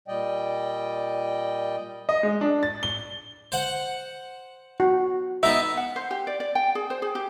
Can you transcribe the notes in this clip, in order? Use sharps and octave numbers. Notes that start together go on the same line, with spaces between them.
A#2 G3 D5 D#5 G5
D#5
G#3
D4
A6
G7
C5 F#5
F#4
B3 D#4 E5
F#5
C5
G4
D5
D5
G5
G#4
C5
G#4
G4